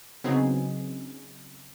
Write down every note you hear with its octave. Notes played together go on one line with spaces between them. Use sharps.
C#3 F#3 B3 C4 D#4 G#4